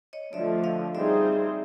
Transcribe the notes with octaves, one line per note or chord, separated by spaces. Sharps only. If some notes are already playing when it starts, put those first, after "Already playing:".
C#5 D#5
D3 F3 A3 D5 E5
D#5 F5
G3 C4 D#4 G#4 C5 D5 E5